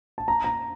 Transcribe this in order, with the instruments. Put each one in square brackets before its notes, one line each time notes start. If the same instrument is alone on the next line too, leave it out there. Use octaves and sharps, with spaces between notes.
[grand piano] A5
A#5
A#5